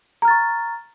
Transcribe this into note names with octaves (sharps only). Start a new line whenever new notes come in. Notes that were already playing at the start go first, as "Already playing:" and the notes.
A#5 C#6 F6 A6